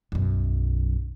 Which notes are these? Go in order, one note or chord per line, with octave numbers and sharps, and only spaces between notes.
B1 F#2